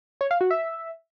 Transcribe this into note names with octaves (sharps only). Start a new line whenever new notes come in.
C#5
F5
F#4
E5